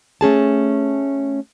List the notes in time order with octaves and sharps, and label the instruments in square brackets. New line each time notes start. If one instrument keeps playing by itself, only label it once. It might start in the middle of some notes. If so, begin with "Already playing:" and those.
[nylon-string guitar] A3 C#4 G#4 A5